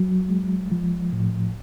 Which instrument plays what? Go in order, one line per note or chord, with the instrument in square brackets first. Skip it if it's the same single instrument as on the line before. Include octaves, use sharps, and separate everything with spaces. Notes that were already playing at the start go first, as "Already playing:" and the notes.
Already playing: [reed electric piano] F#3
G#3
F3
A2